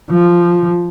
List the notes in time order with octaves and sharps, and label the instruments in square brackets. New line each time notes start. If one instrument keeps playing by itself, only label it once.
[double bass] F3